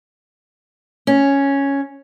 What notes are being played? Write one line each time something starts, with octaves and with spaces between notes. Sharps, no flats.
C#4